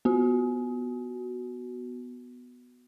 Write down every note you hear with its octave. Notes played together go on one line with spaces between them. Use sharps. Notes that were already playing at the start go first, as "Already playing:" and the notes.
B3 F#4